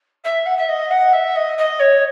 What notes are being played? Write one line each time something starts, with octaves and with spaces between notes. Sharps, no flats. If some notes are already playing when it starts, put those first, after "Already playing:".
E5
F#5
E5
D#5
F#5
E5
D#5
D#5
C#5